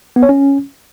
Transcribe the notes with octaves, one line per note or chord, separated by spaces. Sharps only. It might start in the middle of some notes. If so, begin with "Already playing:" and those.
B3
C#5
C#4